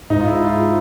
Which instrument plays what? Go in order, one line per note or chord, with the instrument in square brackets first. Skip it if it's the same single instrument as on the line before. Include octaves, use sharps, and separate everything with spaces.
[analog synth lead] G#2 [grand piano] D#4
[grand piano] F4
E4
F4